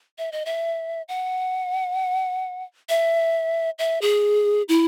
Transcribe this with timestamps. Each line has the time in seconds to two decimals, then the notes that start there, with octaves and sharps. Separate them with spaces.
0.18 E5
0.32 D#5
0.46 E5
1.08 F#5
2.89 E5
3.79 E5
4.02 G#4
4.69 E4